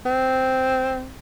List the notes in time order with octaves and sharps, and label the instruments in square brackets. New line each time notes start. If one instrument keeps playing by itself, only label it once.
[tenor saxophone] C4